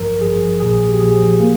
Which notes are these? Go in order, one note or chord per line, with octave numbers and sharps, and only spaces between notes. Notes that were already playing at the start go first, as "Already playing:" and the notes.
Already playing: G#1 G2 F3 A#4
G#1 G2 F3 G#4
A#1 A#2 F3 G#4
G4
A#1 A#2 F3 G#4
C3 A#3